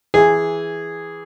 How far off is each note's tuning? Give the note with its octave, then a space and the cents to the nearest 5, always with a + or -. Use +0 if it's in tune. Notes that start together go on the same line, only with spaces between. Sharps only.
E3 +0 G#4 -5